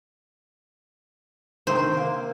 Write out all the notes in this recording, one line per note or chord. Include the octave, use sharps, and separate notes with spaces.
C3 D#3 C5
A#3